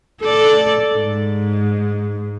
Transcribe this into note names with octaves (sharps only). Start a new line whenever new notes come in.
A4 D5
G#2